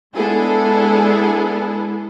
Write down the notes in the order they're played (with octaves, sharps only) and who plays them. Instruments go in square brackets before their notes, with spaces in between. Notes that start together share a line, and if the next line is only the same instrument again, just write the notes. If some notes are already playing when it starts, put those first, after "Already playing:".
[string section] G#3 B3 D4 E4 G#4 A4